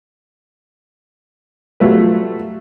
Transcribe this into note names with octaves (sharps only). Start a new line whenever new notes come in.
F#3 G3 A3 F4 B4